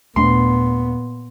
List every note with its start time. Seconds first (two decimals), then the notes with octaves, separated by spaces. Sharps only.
0.16 D#2 A#2 A3 B3 D4 C6